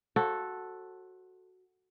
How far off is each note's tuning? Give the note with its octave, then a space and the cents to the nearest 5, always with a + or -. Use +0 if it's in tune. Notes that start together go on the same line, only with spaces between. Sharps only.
F#4 +0 A4 +0 C5 +35